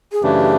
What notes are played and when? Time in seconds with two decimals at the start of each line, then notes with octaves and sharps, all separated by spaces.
0.12 G#4
0.22 F#2 C#3 E3 A3 D4 G4